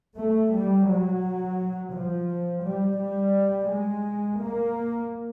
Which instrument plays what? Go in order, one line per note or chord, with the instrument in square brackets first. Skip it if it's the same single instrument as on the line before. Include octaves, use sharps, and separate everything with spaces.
[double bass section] A3
G3
F#3
F3
G3
G3
G#3
A#3